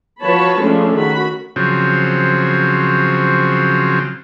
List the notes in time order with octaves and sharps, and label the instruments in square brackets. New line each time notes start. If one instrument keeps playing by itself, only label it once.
[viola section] F3 F#4 B4 C#5 A5 B5
F3 G#3 A3 C#4 D4
D#3 F#4 B5
[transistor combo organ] C#3 F3 F#3 C4